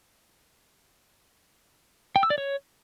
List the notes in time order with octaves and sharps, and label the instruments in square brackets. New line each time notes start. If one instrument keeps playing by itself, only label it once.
[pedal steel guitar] G5
E6
D5
C#5